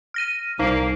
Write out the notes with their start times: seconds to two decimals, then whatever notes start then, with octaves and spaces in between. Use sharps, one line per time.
0.14 F6 A#6 D#7
0.59 C2 A#3 D#4 C5 F5